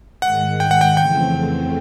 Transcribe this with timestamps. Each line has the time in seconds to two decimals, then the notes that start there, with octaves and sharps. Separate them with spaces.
0.22 G#2 D#3 G#3 F#5
0.60 G5
0.71 F#5
0.81 G5
0.97 F2 C#3 E3 A3 C4 G5